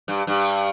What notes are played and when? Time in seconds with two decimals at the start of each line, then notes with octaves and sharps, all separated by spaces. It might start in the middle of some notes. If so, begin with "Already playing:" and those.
0.08 G2
0.27 G2